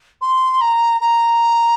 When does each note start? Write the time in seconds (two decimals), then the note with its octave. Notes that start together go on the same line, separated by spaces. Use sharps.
0.21 C6
0.61 A#5
1.01 A#5